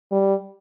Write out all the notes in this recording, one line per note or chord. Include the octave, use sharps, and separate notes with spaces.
G3